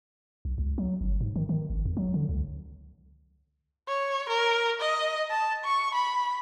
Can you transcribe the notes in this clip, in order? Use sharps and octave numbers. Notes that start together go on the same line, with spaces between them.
B1
C#2
F#3
G1
G#2
D#3
D#3
G#1
E2
F#3
D3
C#2
C#5
A#4
D#5
A5
C#6
B5